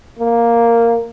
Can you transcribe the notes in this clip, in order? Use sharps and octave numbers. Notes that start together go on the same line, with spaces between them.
A#3